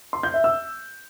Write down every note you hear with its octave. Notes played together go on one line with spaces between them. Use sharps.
C6
G6
E5
E6